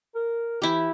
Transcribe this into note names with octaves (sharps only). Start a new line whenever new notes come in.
A#4
E3 E4 G4